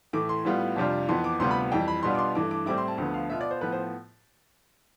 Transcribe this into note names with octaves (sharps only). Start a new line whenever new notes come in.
A2 E3 A3 D6
C6
A2 G3 B3 F4
F2 C3 G3 D4 F4
F2 E3 B3 C6
D6
D2 C3 G3 B3 F4 C6
B5
F2 E3 G3 G5
B5
B2 G3 B3 D4 F4 C6
D6
C6
G2 E3 A3 D6
D6
A2 G3 C4 E4 D6
C6
A5
D2 D3 F3 B3
F5
B2 B3 F4 E5
D5
C5
A2 F3 B3 B4
C5